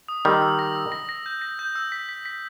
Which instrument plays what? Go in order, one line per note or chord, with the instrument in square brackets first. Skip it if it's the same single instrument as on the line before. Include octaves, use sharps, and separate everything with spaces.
[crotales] D#6
[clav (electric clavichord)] D#3 G3 [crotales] E6
[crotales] E6
A#6
E6
A#6
A#6
G6
A#6
G6
E6
B6
B6
B6